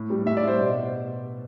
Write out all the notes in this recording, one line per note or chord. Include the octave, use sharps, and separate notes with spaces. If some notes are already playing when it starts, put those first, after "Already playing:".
Already playing: A2
G3
A2 E5
D5
G3 C5
B2